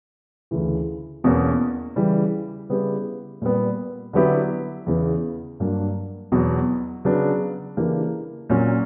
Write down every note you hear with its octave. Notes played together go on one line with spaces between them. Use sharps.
D2 C#3 E3
E2 B2 A#3 C#4
C#3 E3 G3
C#3 G3 B3 E4 G4
A#2 G3 B3
D3 F#3 B3 E4 G4
E2 C#3 E3 B3
G2 F#3 A#3 D4
E2 B2 F#3
C#3 F#3 B3 D4
C#3 E3 A#3 D4 G4
A#2 F#3 C#4 F#4